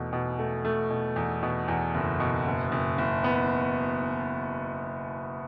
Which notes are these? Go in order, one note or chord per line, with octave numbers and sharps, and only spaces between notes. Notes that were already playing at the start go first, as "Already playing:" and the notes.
Already playing: E2 B2 A3
B2
A3
A3
B2
E2
B2
E2
F#1
B2
F#1
F#1
F#1
B3